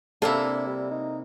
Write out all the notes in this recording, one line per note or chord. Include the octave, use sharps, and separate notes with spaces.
C3 A#3 D4 E4 A4
G3
D#4